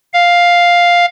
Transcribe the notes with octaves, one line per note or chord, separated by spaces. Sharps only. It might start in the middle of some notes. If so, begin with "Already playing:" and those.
F5